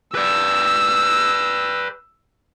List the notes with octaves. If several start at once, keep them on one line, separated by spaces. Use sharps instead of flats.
B4 D5 E6